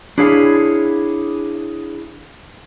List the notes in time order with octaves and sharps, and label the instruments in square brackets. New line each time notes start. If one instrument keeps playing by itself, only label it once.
[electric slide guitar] D4 E4 G#4 C#5 F5